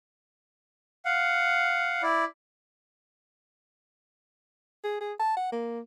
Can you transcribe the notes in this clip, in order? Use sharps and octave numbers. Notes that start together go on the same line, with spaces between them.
F5 F#5
E4 D5
G#4
G#4
A5
F#5
A#3